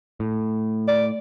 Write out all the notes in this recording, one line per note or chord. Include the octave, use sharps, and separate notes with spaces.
A2
D5